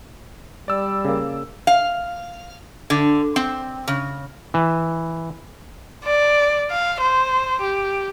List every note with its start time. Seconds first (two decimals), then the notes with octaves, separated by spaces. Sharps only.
0.68 G3 D5 E6
1.05 C#3 A#3
1.67 F5
2.90 D3
3.36 C4
3.88 C#3
4.54 E3
6.05 D5
6.71 F5
7.01 C5
7.61 G4